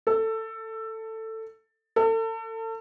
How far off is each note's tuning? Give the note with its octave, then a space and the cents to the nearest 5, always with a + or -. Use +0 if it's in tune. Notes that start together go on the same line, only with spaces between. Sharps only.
A4 +15
A4 +35